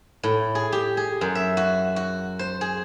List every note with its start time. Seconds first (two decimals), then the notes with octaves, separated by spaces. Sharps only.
0.23 A2
0.55 G#4
0.72 G4
0.97 G#4
1.21 F#2
1.35 E5
1.57 F#4
1.96 F#4
2.39 C5
2.61 G#4